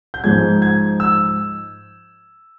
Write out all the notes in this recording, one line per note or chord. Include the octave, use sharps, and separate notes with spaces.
G6
G#2 F3 G#3 G#6
G#6
E6